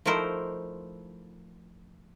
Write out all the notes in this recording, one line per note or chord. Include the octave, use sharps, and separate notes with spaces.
F3 A3 D#4 E4 A#4 C5